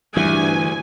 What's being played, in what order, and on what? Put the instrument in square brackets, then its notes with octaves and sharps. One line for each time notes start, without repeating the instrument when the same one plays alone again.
[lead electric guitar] D2 [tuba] G2 [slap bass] E3 [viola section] G#5